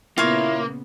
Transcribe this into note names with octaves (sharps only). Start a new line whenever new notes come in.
A#2 C#3 A#3 B3 E4 F4 C#5